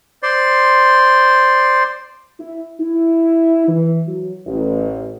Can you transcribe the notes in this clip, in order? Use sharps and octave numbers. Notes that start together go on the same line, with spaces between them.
C5 D5 C6
E4
E4
E3
F#3
A1